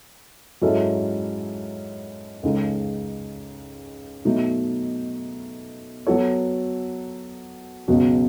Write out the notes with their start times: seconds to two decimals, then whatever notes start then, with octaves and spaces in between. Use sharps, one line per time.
0.62 G#2 F#3 C#4 E4 A4
2.43 C#2 C#3 G#3 D#4 A4
4.25 B2 F#3 A3 D#4
6.07 F#3 B3 F#4 A4 C#5
7.88 C#2 B2 F#3